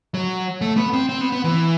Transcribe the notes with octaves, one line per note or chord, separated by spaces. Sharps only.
F#3
A3
B3
C4
C4
B3
B3
E3